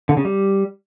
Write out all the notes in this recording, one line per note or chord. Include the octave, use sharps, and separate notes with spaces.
D3
C#3
G3